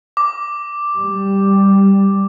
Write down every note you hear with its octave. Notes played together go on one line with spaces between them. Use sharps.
D6
G3